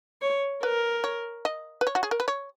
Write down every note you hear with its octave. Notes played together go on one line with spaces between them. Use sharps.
C#5
A#4 B4
C#5
D#5
B4
C#5
F#4
G#4
A#4
B4
C#5